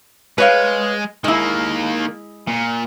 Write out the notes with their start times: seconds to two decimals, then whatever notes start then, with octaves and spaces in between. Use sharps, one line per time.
0.38 G#3 B4 C#5 F5
1.24 D#3 G#3 A#3 E4
2.47 A#2